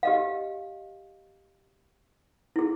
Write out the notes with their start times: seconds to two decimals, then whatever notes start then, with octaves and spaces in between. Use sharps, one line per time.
0.03 G4 D#5 F5
2.56 E4 G#4